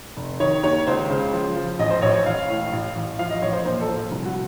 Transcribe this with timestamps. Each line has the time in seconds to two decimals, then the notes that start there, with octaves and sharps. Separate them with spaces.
0.16 F1
0.40 D#3 C#5
0.63 D#2 C#5
0.87 C#2 C5
1.09 C#3
1.33 F3
1.56 F3
1.79 A1 D#5
1.91 C5
2.02 A1 C#5
2.14 C#5
2.25 A1 F5
2.48 A2
2.72 A1
2.95 A1
3.19 F3 F5
3.30 D#5
3.42 A1 C#5
3.53 C5
3.65 A#2 C5
3.81 A4
3.88 F3
3.96 F4
4.11 C2
4.25 F#4